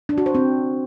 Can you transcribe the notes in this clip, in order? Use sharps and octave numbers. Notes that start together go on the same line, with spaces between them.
D4
F#4
C5
C4